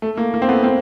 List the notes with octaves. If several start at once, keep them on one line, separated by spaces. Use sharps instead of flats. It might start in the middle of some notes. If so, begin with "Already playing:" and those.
A3
A#3
A#3
C4
A3 B3
A#3 C4